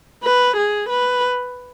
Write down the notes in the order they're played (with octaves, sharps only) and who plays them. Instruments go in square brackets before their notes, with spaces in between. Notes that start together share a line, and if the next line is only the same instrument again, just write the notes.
[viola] B4
G#4
B4